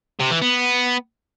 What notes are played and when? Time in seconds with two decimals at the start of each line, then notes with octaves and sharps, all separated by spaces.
0.20 C3
0.31 E3
0.42 B3